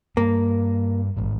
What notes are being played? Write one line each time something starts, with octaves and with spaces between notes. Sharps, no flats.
G2 A#3
A1 G#2